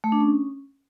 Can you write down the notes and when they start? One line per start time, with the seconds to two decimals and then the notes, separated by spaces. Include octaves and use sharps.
0.04 A3
0.12 D4
0.21 C#4